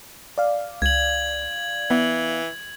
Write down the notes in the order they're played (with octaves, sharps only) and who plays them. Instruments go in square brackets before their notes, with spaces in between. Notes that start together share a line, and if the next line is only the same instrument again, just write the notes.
[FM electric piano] D5 F5
[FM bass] C#2 [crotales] G#6 F#7
[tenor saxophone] E3 [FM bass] B3